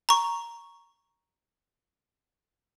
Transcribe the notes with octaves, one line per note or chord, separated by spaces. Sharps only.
A#5 C#6